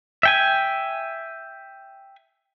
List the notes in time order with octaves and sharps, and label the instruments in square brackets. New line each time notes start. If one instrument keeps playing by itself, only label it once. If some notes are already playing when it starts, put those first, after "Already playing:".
[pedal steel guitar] E5 G5 G#5